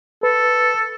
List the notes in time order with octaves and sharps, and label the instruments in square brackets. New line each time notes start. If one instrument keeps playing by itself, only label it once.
[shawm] A4 [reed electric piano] B4